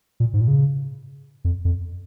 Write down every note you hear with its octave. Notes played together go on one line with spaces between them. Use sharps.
A#2
G#2
A#2
C#3
F2
F2